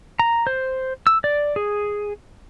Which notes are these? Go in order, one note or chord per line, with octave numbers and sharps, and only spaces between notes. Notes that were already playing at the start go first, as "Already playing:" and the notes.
A#5
C5
E6
D5
G#4